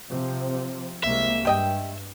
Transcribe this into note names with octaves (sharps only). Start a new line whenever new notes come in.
C3 F3 C4
C2 G#3 A#3 E5
G2 G4 D#5 G5